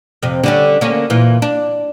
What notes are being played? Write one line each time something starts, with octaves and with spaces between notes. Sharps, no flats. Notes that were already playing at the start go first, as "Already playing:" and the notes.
F2 C3
D3 G3 C#4
D3 A#3 C#4
A#2 E3 F4
D4